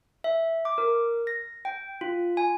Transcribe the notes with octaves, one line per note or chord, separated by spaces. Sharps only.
E5
D6
A#4
A#6
G5
F4
G#5